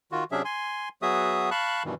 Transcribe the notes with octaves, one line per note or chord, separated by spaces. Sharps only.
D#3 F4 F#4
C3 F#3 C#4 D4 G#4 E5
G#5 C6
F#3 B3 F#4 G#4 E5 D#6
F5 A5 B5 C#6 F#6
G2 B2 D#3 E3